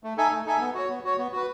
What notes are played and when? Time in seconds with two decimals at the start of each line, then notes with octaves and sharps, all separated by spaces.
0.04 A3
0.17 D#4 A4 E5 G#5
0.32 A3
0.46 D#4 A4 E5 G#5
0.60 B3
0.74 F#4 C#5
0.89 B3
1.04 F#4 C#5
1.18 B3
1.32 F#4 B4